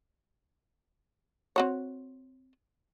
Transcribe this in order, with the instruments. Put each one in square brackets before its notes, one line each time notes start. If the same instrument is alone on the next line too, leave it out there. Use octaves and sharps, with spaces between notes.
[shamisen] C4 F#4 C#5